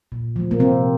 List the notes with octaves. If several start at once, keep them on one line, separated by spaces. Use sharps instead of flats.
A#2
F3 A3
A#3
C3 C4